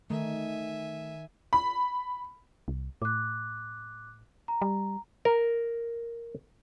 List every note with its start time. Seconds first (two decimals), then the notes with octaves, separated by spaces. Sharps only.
0.10 D#3 A3 E5 G#5
1.53 B5
2.68 C2
3.02 A2 D6 F#6
4.48 A#5
4.62 G3
5.25 A#4